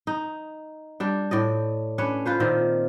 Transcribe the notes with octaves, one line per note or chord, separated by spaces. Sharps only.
D#4
G3 D4
A2 D5 D#5
C#4 D4 B4 C#5
F4 B4 C5
A#2 D#3 C4